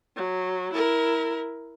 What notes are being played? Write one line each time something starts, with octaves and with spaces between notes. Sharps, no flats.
F#3
E4 A#4